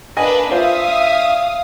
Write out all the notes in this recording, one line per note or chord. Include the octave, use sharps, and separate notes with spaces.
A#3 D4 B4 D#5 G#5
D4 F4 C5 C#5 E5 F5 D#6